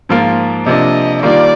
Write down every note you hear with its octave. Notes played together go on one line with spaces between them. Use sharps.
G#2 F3 A#3 F4
C3 F3 A#3 D4 D#5
D#3 G3 A#3 F4 D5